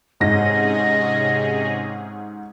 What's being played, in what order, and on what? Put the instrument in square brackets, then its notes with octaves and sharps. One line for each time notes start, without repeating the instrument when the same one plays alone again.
[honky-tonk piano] G#2 A#6 [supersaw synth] C3 C#4 G#4 [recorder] D#5